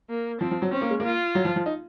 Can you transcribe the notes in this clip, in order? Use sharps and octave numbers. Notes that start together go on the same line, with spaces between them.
A#3
F3 C4
F3
F#3
C4 C#4
A#3
G#3
A#3 F4
F#3
F3
F3
D#4